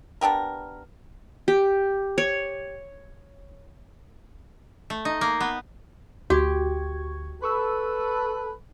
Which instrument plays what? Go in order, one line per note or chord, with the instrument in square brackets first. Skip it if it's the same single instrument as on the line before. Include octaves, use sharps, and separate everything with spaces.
[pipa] B3 D4 G4 A#4
[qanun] G4
C#5
[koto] A3
D#4
A#3
B3
[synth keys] D2 C#6 G#6 [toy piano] F#4 [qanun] G4
[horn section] A4 B4 [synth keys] B5 C#6 E6